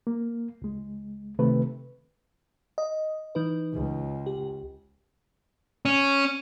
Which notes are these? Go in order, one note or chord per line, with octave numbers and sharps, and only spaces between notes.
A#3
C#2 G#3
C3 D#3 A3 B4
D#5
E3 D#4 B4
C#2
G4
C#4